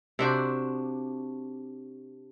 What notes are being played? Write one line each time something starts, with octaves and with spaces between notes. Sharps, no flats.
C3 D4 F#4 C5